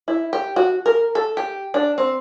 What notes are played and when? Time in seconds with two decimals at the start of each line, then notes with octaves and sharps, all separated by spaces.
0.08 E4
0.33 G4
0.56 F#4
0.86 A#4
1.15 A4
1.37 G4
1.74 D4
1.98 C4